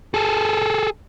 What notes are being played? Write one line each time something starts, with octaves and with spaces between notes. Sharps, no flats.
G#4 A4